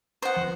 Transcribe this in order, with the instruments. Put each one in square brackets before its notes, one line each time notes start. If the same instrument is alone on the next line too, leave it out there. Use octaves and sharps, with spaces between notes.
[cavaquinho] C5 D#5 F#5
[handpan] F3